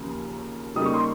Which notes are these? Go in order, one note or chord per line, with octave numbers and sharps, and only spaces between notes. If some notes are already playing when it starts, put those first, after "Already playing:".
Already playing: D#2 C#3 F3 A#3
C#3 G3 A#3 D#4 D#6
C#6
C6